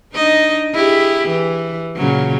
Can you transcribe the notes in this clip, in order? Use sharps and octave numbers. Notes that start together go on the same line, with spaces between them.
D4 D#4 D#5
E4 G4 G#4
E3
A#2 C#3 F#3